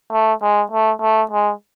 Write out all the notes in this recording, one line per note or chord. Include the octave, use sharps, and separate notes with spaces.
A3
G#3
A3
A3
G#3